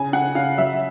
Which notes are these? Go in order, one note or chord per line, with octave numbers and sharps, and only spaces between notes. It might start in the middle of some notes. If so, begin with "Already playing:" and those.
Already playing: C#3 G#5
C#3 F#5
C#3 F5
F#3 E5